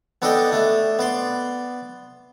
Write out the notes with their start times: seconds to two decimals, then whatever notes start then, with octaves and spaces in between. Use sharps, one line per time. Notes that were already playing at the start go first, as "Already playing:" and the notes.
0.22 B3 D4 A4 D5 D#5 G5
0.52 A3 D4
0.99 B3 D5 C6